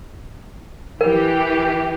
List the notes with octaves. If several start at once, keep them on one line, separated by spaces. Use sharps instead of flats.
E3 G4 A#4